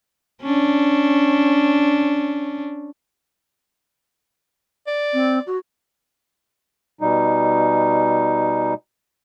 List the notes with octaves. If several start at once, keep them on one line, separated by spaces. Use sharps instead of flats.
C#4 D4
D5
C4
F#4
B2 G3 D#4